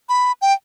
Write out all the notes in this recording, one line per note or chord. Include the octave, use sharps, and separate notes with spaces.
B5
G5